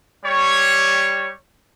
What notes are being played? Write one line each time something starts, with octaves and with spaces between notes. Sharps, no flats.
G3 C#5